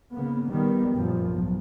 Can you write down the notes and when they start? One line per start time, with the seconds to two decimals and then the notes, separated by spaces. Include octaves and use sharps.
0.12 G#2 C#3 A#3 B3
0.50 D#3 G3 B3
0.94 F#2 A#2 F3
1.30 B1 G#2